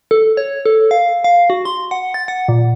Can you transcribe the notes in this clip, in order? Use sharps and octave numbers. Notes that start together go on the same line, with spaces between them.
A4
C#5
A4
F5
F5
F#4
C6
F#5
A6
F#5
A#2